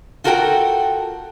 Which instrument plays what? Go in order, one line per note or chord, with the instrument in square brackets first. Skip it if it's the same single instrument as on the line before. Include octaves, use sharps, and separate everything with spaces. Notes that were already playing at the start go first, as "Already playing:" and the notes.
[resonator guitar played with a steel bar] F4 F#4 A4 A#4 F5 G5